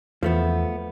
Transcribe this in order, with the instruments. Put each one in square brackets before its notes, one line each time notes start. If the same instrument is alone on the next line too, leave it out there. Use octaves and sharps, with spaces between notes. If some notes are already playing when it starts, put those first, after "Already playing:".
[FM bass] E2 [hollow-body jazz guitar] F3 A3 B3